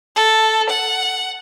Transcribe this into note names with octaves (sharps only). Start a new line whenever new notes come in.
A4
F#5